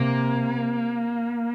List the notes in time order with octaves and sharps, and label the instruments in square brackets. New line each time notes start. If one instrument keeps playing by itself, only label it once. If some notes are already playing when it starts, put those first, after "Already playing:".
Already playing: [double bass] C3 [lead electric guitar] A#3